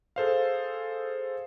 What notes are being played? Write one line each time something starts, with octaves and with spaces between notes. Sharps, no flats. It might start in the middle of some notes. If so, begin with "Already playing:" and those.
G#4 A4 C5 F5